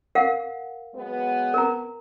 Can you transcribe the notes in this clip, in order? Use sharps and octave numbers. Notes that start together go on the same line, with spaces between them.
A#4 F5 F#5
F#3 G#3 B3
A#4 A#5